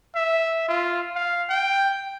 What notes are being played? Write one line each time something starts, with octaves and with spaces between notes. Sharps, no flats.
E5
F4
F5
G5